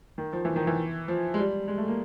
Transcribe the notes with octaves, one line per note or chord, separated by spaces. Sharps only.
D#3
F3
E3
D#3
E3
F3
G#3
G3
G#3
A3
A#3